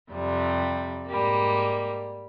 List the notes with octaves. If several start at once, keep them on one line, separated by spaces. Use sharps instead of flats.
F2 C3 G3
G#2 G3 A#3